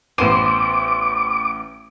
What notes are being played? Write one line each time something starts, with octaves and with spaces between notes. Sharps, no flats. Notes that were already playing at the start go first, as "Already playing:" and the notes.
A1 B3 C5 D6 D#7